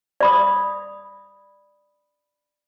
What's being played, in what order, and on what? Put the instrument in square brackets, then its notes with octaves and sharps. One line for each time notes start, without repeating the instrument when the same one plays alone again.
[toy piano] D5 B5 D#6